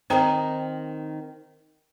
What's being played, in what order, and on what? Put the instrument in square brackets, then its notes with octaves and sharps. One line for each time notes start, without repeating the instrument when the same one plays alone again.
[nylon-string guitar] D#3 C4 D#4 [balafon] C5 G5 A#5